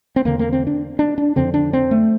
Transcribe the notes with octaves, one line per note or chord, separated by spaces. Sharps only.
C4
E2 D3 A#3
A#3
C4
D4
D4
D4
F2 D3 C4
D4
C4
A3